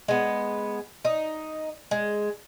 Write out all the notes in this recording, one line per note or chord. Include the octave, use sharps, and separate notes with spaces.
G#3 B3
D#4
G#3